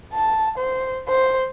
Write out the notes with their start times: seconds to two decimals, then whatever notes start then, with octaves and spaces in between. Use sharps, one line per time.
0.14 A5
0.58 C5
1.08 C5